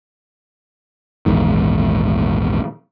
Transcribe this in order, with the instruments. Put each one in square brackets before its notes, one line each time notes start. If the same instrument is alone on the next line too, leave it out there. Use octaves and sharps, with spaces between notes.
[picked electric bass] A#1 E2 G#2 D#3